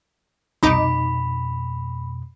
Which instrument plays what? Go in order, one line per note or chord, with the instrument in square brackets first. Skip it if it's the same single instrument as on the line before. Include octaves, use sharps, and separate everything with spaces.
[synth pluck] C2 D#4 D6 [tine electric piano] F2 B2 [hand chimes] B5